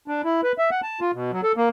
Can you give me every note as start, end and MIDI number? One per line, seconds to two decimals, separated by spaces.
0.08 0.22 62
0.24 0.41 64
0.43 0.52 71
0.58 0.70 76
0.71 0.81 78
0.83 1.00 81
1.01 1.11 65
1.14 1.31 47
1.32 1.41 54
1.43 1.52 69
1.57 1.69 58